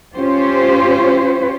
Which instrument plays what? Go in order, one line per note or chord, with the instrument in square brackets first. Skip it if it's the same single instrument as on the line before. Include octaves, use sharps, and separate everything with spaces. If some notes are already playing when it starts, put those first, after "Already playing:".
[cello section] C#4 F4 G4 C5 C#5